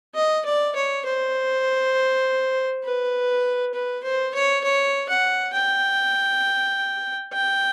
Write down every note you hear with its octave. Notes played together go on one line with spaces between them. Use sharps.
D#5
D5
C#5
C5
B4
B4
C5
C#5
C#5
F#5
G5
G5